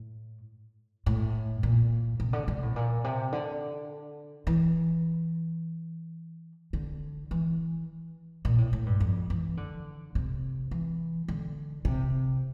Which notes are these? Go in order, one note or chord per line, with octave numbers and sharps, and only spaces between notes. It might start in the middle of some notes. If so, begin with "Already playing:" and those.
Already playing: A2
A2
A#2
C3
D3
C3
A2
A#2
C3
D3
E3
D3
E3
A#2
A2
A2
G2
F2
E3
D3
C3
E3
D3
C3